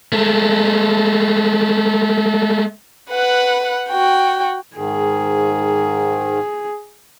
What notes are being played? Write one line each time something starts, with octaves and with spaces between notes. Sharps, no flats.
G#3 A3
B4 F#5
F#4 G5
G#2 D#3 G#4